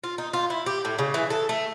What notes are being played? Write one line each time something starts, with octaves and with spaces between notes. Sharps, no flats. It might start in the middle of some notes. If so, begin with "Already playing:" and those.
F4
D#4
F4
E4
G4
A2
C#3
E3
A4
A3